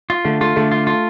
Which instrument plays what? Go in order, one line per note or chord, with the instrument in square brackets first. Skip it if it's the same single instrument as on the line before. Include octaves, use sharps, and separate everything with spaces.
[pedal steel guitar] F4
[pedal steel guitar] D3 [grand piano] A3
[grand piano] A3 [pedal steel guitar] F4
[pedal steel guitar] D3 [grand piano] A3
[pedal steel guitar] F4
F4